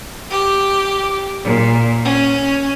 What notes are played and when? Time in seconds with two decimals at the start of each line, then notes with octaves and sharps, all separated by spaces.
0.30 G4
1.44 A#2
2.05 C#4